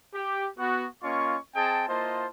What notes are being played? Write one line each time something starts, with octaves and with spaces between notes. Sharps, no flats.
G4
B3 F#4
A#3 C#4 F4 D#5 C#6
C4 G#4 D#5 G5 A5
A#3 E4 F4 C5 D#5 A5